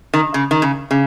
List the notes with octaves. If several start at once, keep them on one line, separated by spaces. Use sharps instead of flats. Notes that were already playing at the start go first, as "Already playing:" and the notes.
D#3
C#3
D#3
C#3
C#3